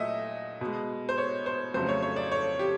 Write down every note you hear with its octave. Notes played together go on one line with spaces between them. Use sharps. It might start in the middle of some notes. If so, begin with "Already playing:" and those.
Already playing: A#2 F#3 A3 D#5 E5
B2 G#3
C5
C#5
C5
F2 C#3 F#3 A3 C5
C#5
C#5
D5
C#5
G4